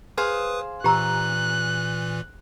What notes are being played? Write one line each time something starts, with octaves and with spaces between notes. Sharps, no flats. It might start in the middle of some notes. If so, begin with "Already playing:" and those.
G#4 B4 C5 F5 D#6
A#2 E3 G4 A#5 E6 F#6